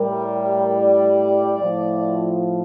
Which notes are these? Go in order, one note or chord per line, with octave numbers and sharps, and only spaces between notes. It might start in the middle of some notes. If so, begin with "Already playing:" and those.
Already playing: A2 G3 A#4
D5
A2 F3